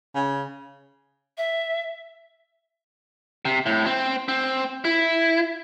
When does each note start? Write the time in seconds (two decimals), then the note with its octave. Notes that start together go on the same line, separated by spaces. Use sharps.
0.15 C#3
1.38 E5
3.45 C3
3.66 A2
3.86 C4
4.28 C4
4.85 E4